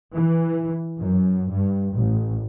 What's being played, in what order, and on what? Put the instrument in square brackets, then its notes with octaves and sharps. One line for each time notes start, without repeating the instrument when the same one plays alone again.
[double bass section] E3
F#2
G2
A1